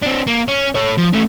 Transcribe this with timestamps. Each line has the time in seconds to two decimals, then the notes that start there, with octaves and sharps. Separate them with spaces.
0.02 C4 D4
0.27 A#3
0.48 C#4
0.75 A3 C#5
0.98 F3
1.13 A3 C#4